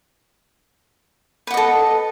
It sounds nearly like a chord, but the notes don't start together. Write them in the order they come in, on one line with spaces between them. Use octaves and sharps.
B4 F#5 D#5 A4